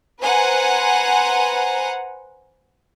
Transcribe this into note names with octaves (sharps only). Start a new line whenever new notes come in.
B4 C5 F#5 G#5 A#5